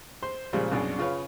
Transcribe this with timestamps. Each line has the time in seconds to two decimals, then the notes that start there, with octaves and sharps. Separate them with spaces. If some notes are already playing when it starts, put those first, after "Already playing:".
0.23 C5 C6
0.53 A#2 C#3 F3 G3 G#3
0.71 C2 F#2 B2 D4 G#4
0.99 C#3 F4 B4 C#5